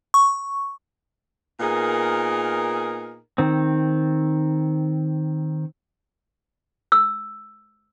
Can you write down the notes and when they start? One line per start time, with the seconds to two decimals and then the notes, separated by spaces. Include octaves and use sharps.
0.14 C#6
1.60 A#2 B3 D#4 G#4 A#4
3.38 D#3 C4
6.92 E6